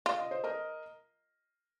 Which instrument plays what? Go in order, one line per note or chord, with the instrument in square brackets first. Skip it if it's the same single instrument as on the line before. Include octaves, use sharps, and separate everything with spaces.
[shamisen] F4 [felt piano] F5
[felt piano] D#5
C5
A#4 D#5